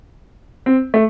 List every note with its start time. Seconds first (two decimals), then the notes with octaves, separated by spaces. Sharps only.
0.66 C4
0.94 A3